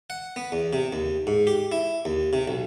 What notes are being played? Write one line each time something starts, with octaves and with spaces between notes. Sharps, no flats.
F#5
B3
E2
C3
D#2
G#2
G4
E4
D#2
C3
B1